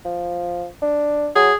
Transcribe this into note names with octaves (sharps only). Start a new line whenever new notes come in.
F3
D4
F#3 G#4